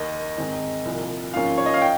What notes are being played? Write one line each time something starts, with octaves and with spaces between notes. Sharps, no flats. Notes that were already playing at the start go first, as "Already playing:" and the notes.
Already playing: D#2 D#3 A#3 D#4 D#5
G#2 D#3 G#3 C4 D#4
C2 A#2 F3
G#2 F3 A#3 C#4 F5
C#5
D#5
F5
G5